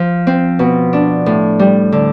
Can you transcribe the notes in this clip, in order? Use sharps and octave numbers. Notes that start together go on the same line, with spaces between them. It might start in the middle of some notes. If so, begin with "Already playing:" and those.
Already playing: F3
C4
B2
D4
A2
G3
D3